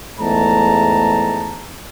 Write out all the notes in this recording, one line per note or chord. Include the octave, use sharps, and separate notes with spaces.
E2 G#2 A3 A5 A#5